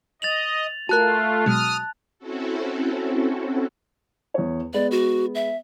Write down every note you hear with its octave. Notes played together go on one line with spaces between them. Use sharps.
D#5 A6 F7 F#7
A3 F4 F#4 A#4 A5 F#6
B2 F#3 G#3 D#6 F6
C4 C#4 E4 F#4 A4
E2 C#5
G#3 B3 B4 D5
F#4
E5